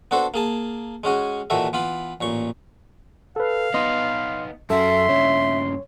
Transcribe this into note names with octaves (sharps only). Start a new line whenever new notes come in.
B3 D4 F#4 A4 C5
A#3 G#4 A5
G#3 C#4 F#4 G#4
D#2 A#2 E3 F#4 A4 E5
E3 B3 F4 B5
A1 A#2 C#6
A4 B4 F5
B3 D#4 D#5 C6
F#2 F#4 A4 E5 C6
G2 C#3 C#5